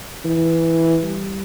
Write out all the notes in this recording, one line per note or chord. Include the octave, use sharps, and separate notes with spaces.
E3
G3